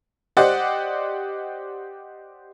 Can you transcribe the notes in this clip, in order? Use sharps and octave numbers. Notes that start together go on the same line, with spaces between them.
G4 C5 D5 D#5 F#5